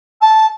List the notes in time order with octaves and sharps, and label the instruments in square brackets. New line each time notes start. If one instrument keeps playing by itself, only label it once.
[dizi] A5